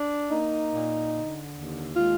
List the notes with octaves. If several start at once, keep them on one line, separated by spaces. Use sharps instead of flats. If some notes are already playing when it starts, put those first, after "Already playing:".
Already playing: D4
A#3 D#4
A#2
D3
D#2
G#3 F4